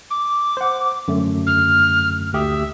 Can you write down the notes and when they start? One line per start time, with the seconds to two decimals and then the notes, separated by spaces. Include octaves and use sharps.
0.10 D6
0.57 C5 F#5
1.08 F#2 D3 A3
1.46 F6
2.33 D2 G4 E5 D#6